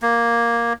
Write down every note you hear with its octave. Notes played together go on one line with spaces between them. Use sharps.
A#3